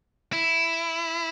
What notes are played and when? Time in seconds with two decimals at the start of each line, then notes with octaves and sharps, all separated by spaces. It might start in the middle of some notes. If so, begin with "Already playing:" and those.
0.33 E4